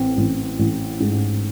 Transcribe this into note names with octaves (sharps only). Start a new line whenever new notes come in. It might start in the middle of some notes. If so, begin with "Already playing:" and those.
Already playing: A1 C4
A1
A1
G#2